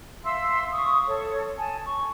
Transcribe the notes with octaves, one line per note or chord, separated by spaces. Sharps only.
E5 F5 C6 E6
C#6 D#6
A4 C#5
G#5 A5
C#6